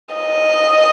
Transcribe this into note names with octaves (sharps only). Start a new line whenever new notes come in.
D#5